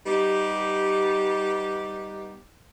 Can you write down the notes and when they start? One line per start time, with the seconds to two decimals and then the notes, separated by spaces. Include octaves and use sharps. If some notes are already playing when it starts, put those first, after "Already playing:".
0.06 G3 B3 D#4 G4